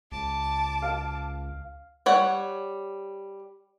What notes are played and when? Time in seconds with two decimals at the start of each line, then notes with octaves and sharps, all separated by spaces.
0.12 C#2 A5 D6
0.82 F5
2.06 G3 C#5 F#5